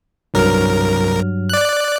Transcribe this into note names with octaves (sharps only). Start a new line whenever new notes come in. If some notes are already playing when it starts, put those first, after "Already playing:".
C2 G2 F#3 A#4 F6
D5 F#6